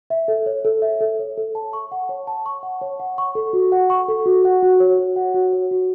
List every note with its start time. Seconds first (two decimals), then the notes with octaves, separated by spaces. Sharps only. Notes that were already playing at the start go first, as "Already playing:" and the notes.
0.10 E5
0.28 A4
0.46 C#5
0.65 A4
0.82 E5
1.01 A4
1.19 C#5
1.37 A4
1.55 A5
1.73 C#6
1.92 F#5
2.09 C#5
2.27 A5
2.46 C#6
2.63 F#5
2.81 C#5
3.00 F#5
3.18 C#6
3.35 A4
3.53 F#4
3.72 F#5
3.90 C#6
4.08 A4
4.26 F#4
4.45 F#5
4.62 F#4
4.80 C#5
4.99 F#4
5.16 F#5
5.34 F#4
5.53 C#5
5.71 F#4